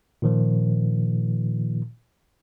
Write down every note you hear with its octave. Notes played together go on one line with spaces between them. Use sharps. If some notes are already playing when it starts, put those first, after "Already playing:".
A#2 D#3 F3